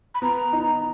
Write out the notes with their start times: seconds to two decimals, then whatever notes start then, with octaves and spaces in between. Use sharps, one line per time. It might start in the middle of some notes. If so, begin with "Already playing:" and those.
0.15 B5
0.22 B3 A#5
0.53 D#4